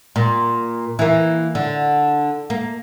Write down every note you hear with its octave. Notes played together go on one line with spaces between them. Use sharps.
A#2
E3 A#3
D3
A#3